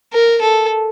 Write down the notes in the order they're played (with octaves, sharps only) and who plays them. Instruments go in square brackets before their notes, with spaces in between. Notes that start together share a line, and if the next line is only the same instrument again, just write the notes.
[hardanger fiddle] A#4
A4